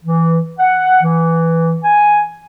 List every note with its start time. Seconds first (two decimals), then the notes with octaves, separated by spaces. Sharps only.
0.05 E3
0.59 F#5
1.03 E3
1.83 G#5